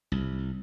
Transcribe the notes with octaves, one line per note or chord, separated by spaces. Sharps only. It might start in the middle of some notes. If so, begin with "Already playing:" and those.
C2